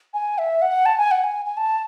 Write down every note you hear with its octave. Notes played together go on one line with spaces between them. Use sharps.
G#5
E5
F#5
A5
G#5
F#5
G#5
G#5
A5